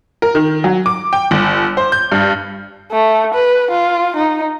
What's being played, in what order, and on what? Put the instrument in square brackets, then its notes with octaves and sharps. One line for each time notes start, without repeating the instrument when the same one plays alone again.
[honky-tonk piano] A#4
D#3
F#3
D6
G5
G1
C5
G6
G2
[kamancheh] A3
B4
F4
D#4